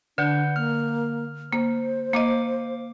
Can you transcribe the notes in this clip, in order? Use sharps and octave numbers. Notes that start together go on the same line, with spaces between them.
D3 D4 B4 F#5 G6
A#3 F6
A#3 C5
A#3 D#5 F5 D6